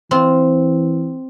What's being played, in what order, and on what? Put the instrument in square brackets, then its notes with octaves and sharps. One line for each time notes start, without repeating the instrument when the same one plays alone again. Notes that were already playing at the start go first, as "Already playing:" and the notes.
[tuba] E3 [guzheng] C4 F4